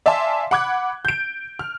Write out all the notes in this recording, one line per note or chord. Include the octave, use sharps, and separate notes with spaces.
D5 E5 F5 G#5 A5 C6
F#5 B5 D6 F#6 G#6
G6 D7
F6